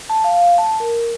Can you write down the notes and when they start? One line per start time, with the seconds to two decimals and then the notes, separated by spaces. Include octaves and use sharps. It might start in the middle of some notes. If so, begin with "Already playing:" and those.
0.10 A5
0.24 F5
0.58 A5
0.80 A#4